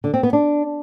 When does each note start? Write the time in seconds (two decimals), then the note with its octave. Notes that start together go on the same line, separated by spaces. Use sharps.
0.04 D3
0.14 C4
0.23 B3
0.33 D4